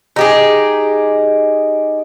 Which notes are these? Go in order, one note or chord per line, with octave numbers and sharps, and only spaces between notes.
D#4 G4 G#4